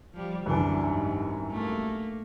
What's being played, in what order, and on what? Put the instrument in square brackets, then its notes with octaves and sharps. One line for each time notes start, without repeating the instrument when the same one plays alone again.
[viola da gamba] F3 G3
[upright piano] C2 F#2 E3 [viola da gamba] D3 D4
[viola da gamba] G#2
A3 A#3